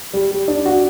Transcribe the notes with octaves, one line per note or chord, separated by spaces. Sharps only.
G3
G3
D4
F#4